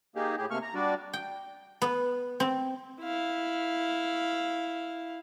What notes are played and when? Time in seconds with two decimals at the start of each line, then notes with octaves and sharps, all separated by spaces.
0.16 A#3 D#4 G4 G#4
0.38 A2 G4 G#4
0.51 C3 A3 A#3 C#6 F6
0.62 A#5
0.75 G3 D4 F#4 D5
1.13 G5
1.82 B3
2.40 C4
3.01 E4 F5